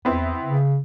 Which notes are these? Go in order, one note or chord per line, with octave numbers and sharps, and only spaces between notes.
E2 B3 C4 E4
C#3